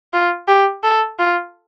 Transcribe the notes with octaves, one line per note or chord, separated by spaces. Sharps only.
F4
G4
A4
F4